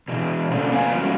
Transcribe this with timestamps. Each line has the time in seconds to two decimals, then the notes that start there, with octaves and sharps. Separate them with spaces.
0.08 B2 E3
0.51 C3 A3 A#3 C#4 D4 A4
0.70 F2 B3 F5 G#5
0.94 F3 F#3 G#3 C#4 F4 F#4